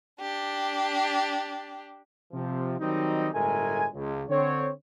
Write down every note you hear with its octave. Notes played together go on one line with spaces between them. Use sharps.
D4 G4
C3 F3
D#3 F#3 G3 C4 D#4
G1 A2 G#3 A3 A#4 G#5
C#2
D3 C4 C#5